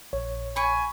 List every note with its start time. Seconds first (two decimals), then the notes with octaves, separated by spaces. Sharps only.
0.13 A#1 C#5
0.56 G#5 B5 C#6